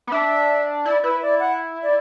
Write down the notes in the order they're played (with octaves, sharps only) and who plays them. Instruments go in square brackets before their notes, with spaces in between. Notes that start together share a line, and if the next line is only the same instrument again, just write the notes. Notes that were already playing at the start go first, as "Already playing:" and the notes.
[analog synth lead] B3
[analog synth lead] D4 [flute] E5
[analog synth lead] E4 [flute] D5
[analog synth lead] E4 [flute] B4
[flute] D5
F#5
D5